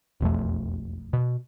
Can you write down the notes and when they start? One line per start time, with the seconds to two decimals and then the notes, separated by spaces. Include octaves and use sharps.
0.21 E1 B1 F2 A3
1.13 B2